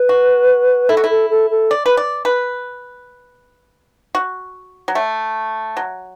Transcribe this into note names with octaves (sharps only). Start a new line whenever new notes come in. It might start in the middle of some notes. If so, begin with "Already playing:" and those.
Already playing: B4
F#4
E4 A4
F#4
E4
A4
A4
A4
D5
B4
D5
B4
F#4
F#3
A3
F#3